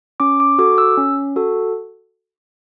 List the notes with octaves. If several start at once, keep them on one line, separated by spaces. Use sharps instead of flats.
C#4 D6
D6
F#4 A4 D6
E6
C#4
F#4 A4